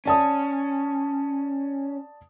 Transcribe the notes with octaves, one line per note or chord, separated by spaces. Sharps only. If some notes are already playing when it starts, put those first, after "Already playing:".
C#4 D5 A5 D#6